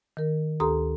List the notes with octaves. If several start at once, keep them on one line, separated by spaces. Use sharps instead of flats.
D#3 A#4
D2 G4 A4 A#5 C6 D#6